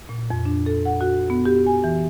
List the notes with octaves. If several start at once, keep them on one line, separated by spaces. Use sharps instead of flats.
A#2
F2
D4
A4
F#5
F#4
B3
G4
G#5
E3